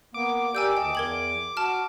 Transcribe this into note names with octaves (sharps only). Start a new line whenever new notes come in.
A#3 B3 D6
G4 A#4 D5 G#5 E6 G6
D2 D#5 G5 A5
E2 A#4 G#6 F#7
F#4 A5 F6